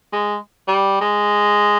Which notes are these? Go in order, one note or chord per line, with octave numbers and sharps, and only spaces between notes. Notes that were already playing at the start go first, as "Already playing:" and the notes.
G#3
G3
G#3